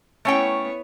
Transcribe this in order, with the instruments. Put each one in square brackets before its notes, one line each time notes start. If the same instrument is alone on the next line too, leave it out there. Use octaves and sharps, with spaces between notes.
[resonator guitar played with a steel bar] A3 C#4 G5 [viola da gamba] B3 E4 C#5